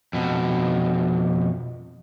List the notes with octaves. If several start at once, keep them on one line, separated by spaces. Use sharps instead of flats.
F2 B2